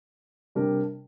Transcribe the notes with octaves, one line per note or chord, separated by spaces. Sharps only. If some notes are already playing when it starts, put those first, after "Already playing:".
C3 G3 D4 G4 A#4